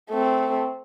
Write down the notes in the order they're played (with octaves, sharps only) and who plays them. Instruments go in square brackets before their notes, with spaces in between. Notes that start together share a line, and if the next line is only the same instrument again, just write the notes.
[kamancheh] A3 C4